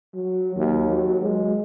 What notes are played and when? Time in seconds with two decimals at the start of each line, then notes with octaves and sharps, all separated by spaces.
0.15 F#3
0.56 D#2
0.89 F#3
1.21 G#3